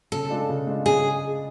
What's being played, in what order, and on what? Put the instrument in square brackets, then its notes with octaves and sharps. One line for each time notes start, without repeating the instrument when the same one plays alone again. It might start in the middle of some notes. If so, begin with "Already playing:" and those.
[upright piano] C#3 [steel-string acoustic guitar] A4
[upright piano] G#3 D4 F4
C#3
G#3 D4 F4
[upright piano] C#3 [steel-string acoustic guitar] G#4